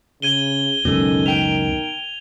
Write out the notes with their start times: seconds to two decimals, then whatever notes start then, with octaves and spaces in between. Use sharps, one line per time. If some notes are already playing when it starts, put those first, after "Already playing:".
0.22 C#3 G#6 D#7 G7
0.85 C#2 F#2 B2 D#3 C#4 A4
1.26 A#4 G5 D7 F7